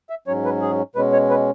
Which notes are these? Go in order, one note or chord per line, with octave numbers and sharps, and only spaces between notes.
E5
G#2 F#3 C#4 C#5
B4
G#4
B2 G#3 C#4 B4
C#5
B4